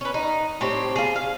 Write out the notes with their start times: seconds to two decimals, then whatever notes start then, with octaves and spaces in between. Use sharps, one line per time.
0.01 C#4 B4
0.14 D#4
0.61 A2 C4 G4 C#5
0.96 F4 G#4
1.16 F5